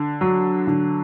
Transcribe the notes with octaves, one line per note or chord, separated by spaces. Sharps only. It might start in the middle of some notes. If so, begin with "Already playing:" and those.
Already playing: D3
F#3
D3